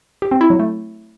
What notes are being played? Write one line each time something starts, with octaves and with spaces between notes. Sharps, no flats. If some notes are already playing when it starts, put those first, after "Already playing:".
G4
C4
E4
F#3
A3